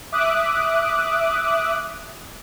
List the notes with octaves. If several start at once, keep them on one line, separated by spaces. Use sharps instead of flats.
E5 D6 D#6 F#6